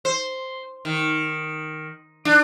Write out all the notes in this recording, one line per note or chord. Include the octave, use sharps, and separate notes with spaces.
C5
D#3
D4